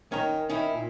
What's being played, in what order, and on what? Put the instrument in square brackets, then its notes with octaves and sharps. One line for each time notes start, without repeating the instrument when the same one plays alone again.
[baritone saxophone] D#3 [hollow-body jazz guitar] C#4 A#5
[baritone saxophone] D#3 [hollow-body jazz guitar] C#4 D#4 E4
[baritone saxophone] A#2